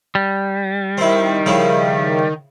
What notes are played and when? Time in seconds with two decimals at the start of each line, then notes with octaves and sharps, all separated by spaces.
0.15 G3
0.98 D#3 C4 E4
1.46 C#3 F3 E4